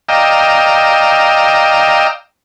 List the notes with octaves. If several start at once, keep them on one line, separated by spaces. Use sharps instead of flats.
D5 D#5 F5 G5 A#5 E6